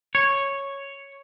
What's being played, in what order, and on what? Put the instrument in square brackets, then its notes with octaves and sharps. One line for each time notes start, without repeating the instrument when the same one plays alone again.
[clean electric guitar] C#5